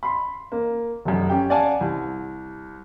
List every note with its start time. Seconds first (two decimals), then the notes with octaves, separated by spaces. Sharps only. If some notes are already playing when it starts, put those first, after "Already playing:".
0.03 B5 C6
0.52 A#3
1.05 F1 F#2
1.29 C#4 G4 G5
1.50 D5 F5 F#5 G#5 A5
1.81 C2